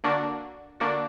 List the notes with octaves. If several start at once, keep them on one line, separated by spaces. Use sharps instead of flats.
D3 A#3 D4 F#4
D3 A#3 D4 F#4